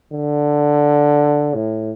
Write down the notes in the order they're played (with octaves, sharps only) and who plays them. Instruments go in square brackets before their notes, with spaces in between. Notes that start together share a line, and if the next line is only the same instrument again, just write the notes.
[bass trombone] D3
A2